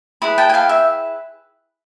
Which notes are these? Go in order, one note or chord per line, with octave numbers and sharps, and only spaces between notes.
E4 G#4 B4 B5
G5 A5
G#5
F5 G5
E5